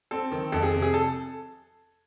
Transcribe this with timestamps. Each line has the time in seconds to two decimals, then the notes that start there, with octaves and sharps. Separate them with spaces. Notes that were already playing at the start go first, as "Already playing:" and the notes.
0.11 C4 A4
0.32 D#3
0.52 F2 A4
0.63 G#4
0.74 C3
0.82 G#4
0.94 A4